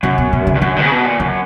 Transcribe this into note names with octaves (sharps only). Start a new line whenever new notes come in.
F#2 C#3
B2
B2
C#3
G2
F#2 D3
G2
C#3
B2
A#2
F#2 C#3